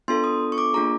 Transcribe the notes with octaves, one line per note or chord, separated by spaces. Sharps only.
B3 D4 F4 A4 C6
D#6
C#6
D6
A#3 D4 F4 G#4 A#5